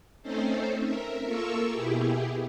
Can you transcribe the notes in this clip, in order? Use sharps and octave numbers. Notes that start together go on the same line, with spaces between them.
A3 C4 C#4 D#4 A4 C5
A#4 E5
A#3 F4 A4 A#4 C#6 E6
B2 E4 G4 G#4